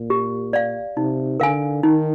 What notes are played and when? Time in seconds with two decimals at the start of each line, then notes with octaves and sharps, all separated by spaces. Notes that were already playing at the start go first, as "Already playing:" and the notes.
Already playing: A#2
0.10 G4
0.53 D5 F5
0.97 C3 D#4
1.40 D3 A#4 F5 G#5
1.83 D#3 D#4